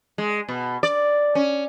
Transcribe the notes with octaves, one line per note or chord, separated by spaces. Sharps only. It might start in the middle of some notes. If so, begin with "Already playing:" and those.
G#3
B2
D5
C#4